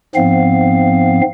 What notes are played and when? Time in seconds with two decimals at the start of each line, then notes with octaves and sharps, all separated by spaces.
0.15 G#2 F3 B3 C4 F5